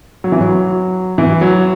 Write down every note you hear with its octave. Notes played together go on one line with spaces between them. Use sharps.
F#3
E3
F#3
E3
F#3